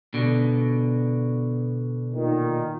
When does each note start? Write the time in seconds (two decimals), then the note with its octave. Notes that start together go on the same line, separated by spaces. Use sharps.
0.14 B2 D3
2.14 A#2 D#3